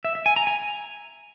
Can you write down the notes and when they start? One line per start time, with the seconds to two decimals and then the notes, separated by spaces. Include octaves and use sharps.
0.05 E5
0.15 E5
0.26 G#5
0.36 A#5
0.47 G#5